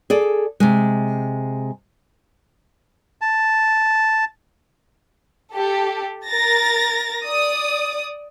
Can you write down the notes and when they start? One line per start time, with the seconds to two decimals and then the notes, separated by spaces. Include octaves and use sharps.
0.10 G#4 A4 D5
0.60 C3 G#3
3.21 A5
5.54 G4 A4
6.27 A#4 A6 A#6
7.24 D5 D#6